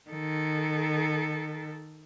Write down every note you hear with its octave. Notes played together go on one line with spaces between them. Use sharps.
D#3 A4